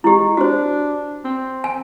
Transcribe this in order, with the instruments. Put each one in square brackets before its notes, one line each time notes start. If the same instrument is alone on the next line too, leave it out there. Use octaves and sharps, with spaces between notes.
[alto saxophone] G#3 [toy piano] E4 G4
[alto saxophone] D4 [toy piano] F#4 C5
[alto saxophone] C4
[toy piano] G#5